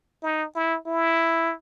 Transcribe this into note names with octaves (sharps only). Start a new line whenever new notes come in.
D#4
E4
E4